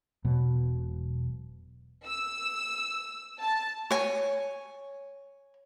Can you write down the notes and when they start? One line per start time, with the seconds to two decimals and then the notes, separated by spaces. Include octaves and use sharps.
0.24 E1 B2 F#3
2.06 E6
3.41 A5
3.91 C#5 G#5